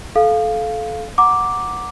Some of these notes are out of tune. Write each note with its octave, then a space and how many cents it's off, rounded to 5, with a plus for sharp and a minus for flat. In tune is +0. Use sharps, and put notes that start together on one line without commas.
A4 -25 F5 +0
F#5 -5 A#5 +0 D6 +0